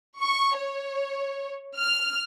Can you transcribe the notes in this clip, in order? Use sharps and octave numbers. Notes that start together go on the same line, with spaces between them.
C#6
C#5
F6